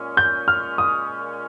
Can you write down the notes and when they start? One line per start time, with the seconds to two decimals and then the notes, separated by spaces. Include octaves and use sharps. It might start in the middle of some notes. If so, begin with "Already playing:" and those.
Already playing: A#2 G#3 C#4
0.17 G6
0.48 F6
0.78 D#6